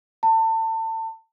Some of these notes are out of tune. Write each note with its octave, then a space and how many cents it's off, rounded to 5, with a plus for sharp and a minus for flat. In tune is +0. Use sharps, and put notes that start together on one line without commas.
A5 +30